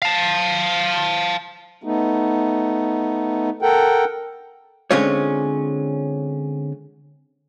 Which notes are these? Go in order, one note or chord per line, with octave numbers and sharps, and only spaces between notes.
F5 A5
A3 B3 D#4
A4 A#4 F#5 G5
D3 G#3 C4 C#4 F4 C#5